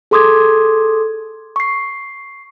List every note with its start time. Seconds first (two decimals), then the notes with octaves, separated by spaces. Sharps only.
0.11 G#4 A4 C6 D6 D#6 G#6
1.56 C#6 C7